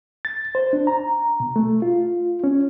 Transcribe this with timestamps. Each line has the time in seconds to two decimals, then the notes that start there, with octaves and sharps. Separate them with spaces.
0.25 A6
0.55 C5
0.73 D4
0.87 A#5
1.40 B2
1.56 A3
1.82 F4
2.44 C#4